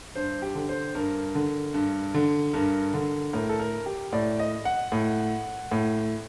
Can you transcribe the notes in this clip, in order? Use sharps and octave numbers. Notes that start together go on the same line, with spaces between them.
G2 C5
G4
D3
C5
G2 A#4
D3
G2
D3
G2 A#4
D3
A2 A#4
A4
A#4
G4
A2 D5
D#5
F#5
A2
A2